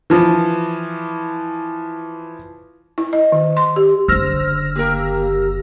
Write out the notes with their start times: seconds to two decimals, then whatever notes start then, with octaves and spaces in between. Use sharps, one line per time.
0.10 E3 F3
2.98 E4
3.13 D#5
3.32 D#3
3.57 C6
3.76 G4
4.08 F#1 D3 C5 E6 F6 A#6
4.75 A#3 G4 A#4